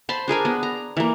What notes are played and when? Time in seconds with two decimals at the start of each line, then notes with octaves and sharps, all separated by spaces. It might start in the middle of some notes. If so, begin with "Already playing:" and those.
0.09 C5 A5 B5 C6
0.28 D4 G#4 A#4 G#5
0.45 B3
0.63 A#5
0.97 E3 A#3